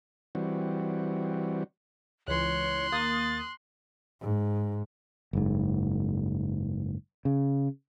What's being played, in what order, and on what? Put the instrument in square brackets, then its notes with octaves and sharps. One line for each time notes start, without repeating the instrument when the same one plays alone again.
[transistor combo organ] E3 G3 C4 F#4
[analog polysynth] C#2 E3 [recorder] C#5 [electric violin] C6 F#6
[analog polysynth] D#2 A#3 D#6 [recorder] A6
[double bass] G#2
[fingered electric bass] F#1 G#2
C#3